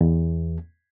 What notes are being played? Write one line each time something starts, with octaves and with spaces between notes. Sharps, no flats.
E2